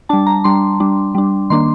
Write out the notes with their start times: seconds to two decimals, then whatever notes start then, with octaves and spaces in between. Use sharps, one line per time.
0.09 G3 D4 A5
0.26 A#5
0.44 G3 D4 C6
0.80 G3 D4
1.15 G3 D4
1.50 D#3 A#3 D4 C6